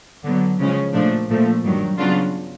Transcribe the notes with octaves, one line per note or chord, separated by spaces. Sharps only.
D3 F#3 B3
C#3 F3 G#3 C#4
A#2 F3 A3 D4
A#2 F3 A3
G2 D#3 F#3
C#3 F#3 B3 D4 F4